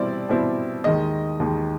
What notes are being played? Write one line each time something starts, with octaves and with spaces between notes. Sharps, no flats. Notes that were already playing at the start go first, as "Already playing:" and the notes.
Already playing: B2 G3 C4 E4 D5
B2 G3 C4 E4
D#2 D#3 G#3 D#5
D#2 D#3 G#3